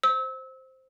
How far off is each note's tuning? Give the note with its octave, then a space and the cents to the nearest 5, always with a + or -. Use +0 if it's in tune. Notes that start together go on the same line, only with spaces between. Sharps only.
C5 +0 E6 -30